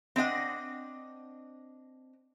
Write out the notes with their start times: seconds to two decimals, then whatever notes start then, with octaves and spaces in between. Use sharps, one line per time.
0.16 C4 D4 D#5 F#5